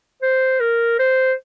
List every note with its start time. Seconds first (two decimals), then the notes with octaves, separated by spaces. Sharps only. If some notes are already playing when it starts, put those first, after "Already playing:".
0.22 C5
0.60 A#4
0.99 C5